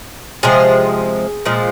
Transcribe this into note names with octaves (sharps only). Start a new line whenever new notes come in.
C3 F3 G#3 G#4
A#2 F3 G#3